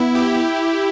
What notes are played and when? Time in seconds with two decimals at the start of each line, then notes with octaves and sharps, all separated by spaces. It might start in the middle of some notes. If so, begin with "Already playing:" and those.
Already playing: B3 E4
0.15 G4